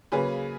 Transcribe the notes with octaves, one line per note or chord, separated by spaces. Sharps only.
C#3 F#3 A#3 C#4 G#4 B4